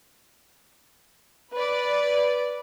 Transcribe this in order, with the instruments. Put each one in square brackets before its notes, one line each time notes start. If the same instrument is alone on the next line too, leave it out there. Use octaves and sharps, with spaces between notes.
[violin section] B4 D5